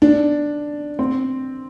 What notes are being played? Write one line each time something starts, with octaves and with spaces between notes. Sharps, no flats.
D4
C4